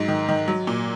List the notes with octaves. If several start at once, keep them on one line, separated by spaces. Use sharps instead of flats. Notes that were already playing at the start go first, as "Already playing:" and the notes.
Already playing: G#2 F#3
D#3
D#3
F#3
A#2